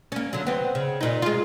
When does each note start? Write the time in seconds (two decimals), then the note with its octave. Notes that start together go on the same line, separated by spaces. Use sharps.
0.12 A#3 C#4
0.33 D3 F#3
0.47 B3 C4
0.75 C#3
1.01 A#2 D#4
1.22 G#3 F4